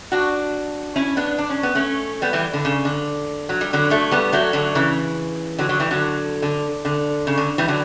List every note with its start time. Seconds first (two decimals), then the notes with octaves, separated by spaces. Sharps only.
0.12 D4 F#4
0.96 C#4 E4
1.17 B3 D4
1.38 D4
1.50 C#4
1.63 B3
1.75 A3 C#4
2.22 G3 B3
2.33 E3 G3
2.53 D3
2.65 C#3
2.85 D3
3.49 F#3
3.61 G3
3.73 D3 F#3
3.90 F#3 A3
4.11 G3 B3
4.32 F#3 A3
4.53 D3 F#3
4.75 C#3 E3
5.58 D3 F#3
5.69 D3 F#3
5.80 E3 G3
5.91 D3 F#3
6.42 D3
6.85 D3
7.27 C#3
7.37 D3
7.58 E3 G3
7.68 D3 F#3